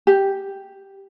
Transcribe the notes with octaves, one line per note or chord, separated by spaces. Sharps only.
G4